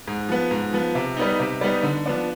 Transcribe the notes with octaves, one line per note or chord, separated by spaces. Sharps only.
G#2
F3 B3
G#2
F3 B3
C3
G3 B3 D#4
C3
G3 B3 D#4
D3
F3 B3 D4